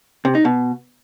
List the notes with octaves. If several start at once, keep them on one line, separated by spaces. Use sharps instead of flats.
C3
D#4
B2